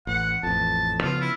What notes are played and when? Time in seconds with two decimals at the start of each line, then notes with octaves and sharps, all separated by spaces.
0.07 A1 F#5
0.43 A1 F2 A5
1.02 C#3 F3 B3 F4
1.21 E4